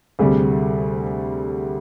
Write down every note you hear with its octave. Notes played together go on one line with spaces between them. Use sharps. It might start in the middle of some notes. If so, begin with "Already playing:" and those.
D2 C3 G3 G#4